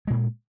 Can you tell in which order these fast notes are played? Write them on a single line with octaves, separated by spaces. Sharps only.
G#3 A#2 A#3